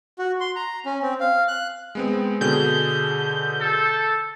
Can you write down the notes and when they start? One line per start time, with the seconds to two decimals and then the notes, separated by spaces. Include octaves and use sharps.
0.19 F#4
0.40 C6
0.56 A#5
0.86 C#4
1.03 C4
1.20 F5
1.48 F#6
1.95 G#3 B3 C4
2.41 B2 D3 G#4 G6
3.61 A4